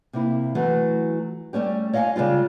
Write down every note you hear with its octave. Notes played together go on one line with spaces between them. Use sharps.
C3 A#3 E4
E3 F#3 A3
G3 A3 C#4 G4
C#5 D#5 F5 F#5 G#5
C#3 G3 G#3 F4